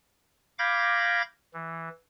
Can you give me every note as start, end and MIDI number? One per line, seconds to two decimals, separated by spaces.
0.59 1.22 77
0.59 1.22 83
0.59 1.22 86
0.59 1.22 91
0.59 1.22 92
0.59 1.22 94
1.54 1.89 52